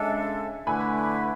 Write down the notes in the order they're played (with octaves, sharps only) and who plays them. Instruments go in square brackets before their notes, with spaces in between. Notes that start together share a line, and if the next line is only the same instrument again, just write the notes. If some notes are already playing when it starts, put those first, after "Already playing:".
Already playing: [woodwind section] C#3 G#3 D4 A4 [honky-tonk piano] E5 G#5
[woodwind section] D3 A3 E4 B4 [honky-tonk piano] G#5 B5